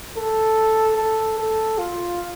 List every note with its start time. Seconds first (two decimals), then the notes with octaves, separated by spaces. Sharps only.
0.17 A4
0.97 A4
1.38 A4
1.78 F4